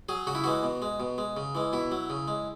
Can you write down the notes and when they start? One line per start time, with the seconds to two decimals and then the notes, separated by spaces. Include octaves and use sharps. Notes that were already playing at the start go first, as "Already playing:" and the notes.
0.09 F#3 G#4
0.27 C#3 F#4
0.35 E4
0.44 E3 G#3 F#4
0.63 B2
0.82 G#3
1.00 B2
1.18 G#3
1.37 C#3
1.55 E3 G#3
1.73 B2 E4
1.92 F#3
2.10 C#3
2.28 G#3